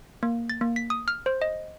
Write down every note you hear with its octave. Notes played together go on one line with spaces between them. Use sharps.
A#3
A6
A#3
B6
D#6
F6
C5
D#5